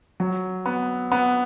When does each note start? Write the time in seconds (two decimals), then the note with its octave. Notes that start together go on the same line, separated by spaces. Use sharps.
0.20 F#3
0.66 B3
1.12 B3